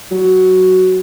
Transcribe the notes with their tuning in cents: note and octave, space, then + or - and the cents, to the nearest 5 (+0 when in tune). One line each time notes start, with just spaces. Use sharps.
F#3 +5